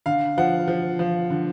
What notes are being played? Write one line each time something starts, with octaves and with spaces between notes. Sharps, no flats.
D3 F5
F3 F#5
F3
F3
D3